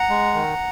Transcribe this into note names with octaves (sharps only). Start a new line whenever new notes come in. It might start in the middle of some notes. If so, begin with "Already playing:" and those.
Already playing: F#5 A#5
G#3
D#3